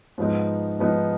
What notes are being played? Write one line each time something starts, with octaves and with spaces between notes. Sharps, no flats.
G#2 F3 B3 D#4
G#2 F3 B3 D#4